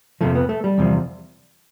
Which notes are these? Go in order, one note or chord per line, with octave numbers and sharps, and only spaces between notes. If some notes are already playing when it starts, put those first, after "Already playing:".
F2 C3 F3 A3
B3
A3
G3
E2 C3 F3